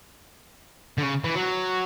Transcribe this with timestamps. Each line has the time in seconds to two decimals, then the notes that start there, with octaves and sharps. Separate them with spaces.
0.98 D3
1.03 C#3
1.24 E3
1.35 F#3